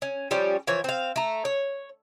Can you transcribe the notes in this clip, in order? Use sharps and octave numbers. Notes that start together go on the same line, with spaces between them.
C#4
F3 G3 C#4 G4
E3 F3 C#5
C4 F5
A3 A#5
C#5